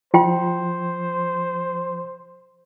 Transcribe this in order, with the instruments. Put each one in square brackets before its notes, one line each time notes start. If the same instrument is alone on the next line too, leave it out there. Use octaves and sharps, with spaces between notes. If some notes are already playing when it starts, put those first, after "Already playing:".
[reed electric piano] F3 [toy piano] F4 G5 C6 [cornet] C5